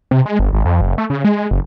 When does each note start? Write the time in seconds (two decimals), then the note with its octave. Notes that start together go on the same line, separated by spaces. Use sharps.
0.11 C3
0.26 G#3
0.39 G1
0.53 G#1
0.65 F2
0.81 F#1
0.98 A3
1.10 C#3
1.24 G#3
1.51 F#1